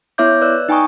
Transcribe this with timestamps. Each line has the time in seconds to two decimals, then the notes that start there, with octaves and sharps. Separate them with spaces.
0.18 B3 E4 C#5 E5 D6 G6
0.41 B4 D5 E6 F#6
0.69 D#4 G5 G#5 A#5 C#6 D#6